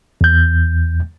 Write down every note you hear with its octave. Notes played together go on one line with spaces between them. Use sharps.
E2 G6